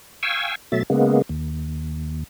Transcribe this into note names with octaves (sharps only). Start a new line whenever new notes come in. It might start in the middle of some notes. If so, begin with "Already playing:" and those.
F5 G5 G#5 C#6 E6
B2 F#3 A3 E5 A6
C#3 G#3 A#3 B3
D#2